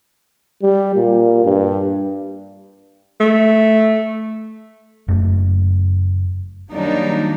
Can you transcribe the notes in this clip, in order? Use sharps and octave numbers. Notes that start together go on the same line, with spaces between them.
G3
A#2
G2
A3
F#1 F#2 A3
D#3 F#3 G3 A#3 D4 D#4